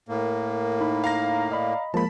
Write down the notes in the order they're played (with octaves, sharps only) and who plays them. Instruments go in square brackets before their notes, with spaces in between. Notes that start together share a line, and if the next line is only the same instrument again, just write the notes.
[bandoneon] A2 A#3 [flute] A#4
[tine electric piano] D#4 B5
[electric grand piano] F5 A#5 A#6
[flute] D5 [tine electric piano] D#5 B5
[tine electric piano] F3 G#3 A#3 [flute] A#4 [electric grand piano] A5 B5